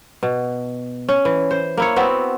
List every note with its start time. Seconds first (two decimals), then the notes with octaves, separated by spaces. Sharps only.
0.23 B2
1.09 C#4
1.25 E3
1.51 C5
1.77 A#3 E4 C#5
1.96 B3 C4 E4 F#4